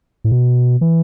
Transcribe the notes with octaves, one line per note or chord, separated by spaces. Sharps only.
A2
B2
E3